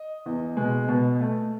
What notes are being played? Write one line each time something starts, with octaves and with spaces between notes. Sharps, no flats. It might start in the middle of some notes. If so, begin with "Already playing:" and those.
Already playing: D#5
E2
B2 G#3
B2
A3